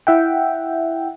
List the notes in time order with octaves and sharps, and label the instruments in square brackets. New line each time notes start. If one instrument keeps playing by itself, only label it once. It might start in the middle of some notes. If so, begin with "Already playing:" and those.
[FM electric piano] E4 E5 F#5 G5